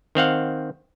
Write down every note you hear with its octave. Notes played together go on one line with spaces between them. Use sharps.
D#3 C4 F5 F#5